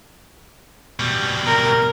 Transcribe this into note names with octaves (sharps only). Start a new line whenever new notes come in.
B2 G3
A#4